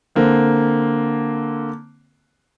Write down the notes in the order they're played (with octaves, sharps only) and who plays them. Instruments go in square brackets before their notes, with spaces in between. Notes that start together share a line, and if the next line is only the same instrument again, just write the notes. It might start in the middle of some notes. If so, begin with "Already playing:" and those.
[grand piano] D3 A#3 C4